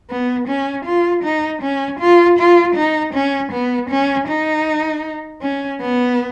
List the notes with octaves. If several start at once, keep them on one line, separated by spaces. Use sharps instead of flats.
B3
C#4
F4
D#4
C#4
F4
F4
D#4
C#4
B3
C#4
D#4
C#4
B3